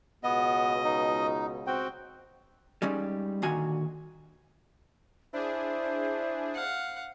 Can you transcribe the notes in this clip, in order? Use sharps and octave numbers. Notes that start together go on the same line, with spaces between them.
C#2 B2 B3 D#5
D#4
C4 F#4 G5
G3 G#3 C#4 D#4
A#2 D3 D#3 F#4 G#5 A#5
D4 E4 G#4 C5
F5 F#5